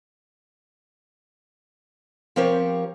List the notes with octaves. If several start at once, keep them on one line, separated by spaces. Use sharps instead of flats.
F3 C4 G4 A#4 C#5